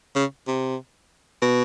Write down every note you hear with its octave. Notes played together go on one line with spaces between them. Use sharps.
C#3
C3
B2